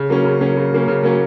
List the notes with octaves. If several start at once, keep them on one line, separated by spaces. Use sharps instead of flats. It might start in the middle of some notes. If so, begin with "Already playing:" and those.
Already playing: C#3
F#3 A#3 C#4
C#3
F#3 A#3 C#4
C#3
F#3 A#3 C#4
C#3
F#3 A#3 C#4